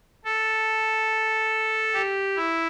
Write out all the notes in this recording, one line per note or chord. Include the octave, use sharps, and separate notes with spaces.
A4
G4
E4